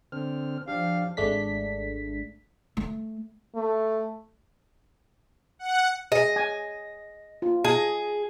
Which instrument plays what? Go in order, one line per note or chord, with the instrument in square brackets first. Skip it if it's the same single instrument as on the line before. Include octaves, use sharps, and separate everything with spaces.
[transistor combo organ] D3 C4 F6
[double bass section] F3 [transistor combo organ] D4 G4 [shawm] F5
[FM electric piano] G#1 G#3 A3 D4 B6
[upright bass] A3
[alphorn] A3
[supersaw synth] F#5
[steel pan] G#4 [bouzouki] D#5
[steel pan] G#5
F4
[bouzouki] G#4 [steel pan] D#5